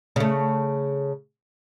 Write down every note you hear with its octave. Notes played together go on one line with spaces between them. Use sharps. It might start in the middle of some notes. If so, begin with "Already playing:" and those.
C#3 A3